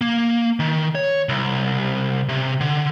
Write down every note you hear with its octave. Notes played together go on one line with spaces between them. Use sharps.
A#3
D#3
C#5
C2
C3
D3